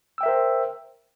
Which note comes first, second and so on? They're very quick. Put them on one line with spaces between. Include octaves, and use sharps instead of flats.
E6 G5 E5 A#4 C5